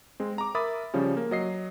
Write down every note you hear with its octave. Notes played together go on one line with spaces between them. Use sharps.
G#3 C4
A#5 D6
A#4 E5 B5 D6 D#6 A6
C#3 F3 G3 C#4
A#3
F#3 D#5 C7